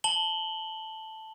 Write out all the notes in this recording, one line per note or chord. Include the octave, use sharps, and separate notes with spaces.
A5 F#7 G7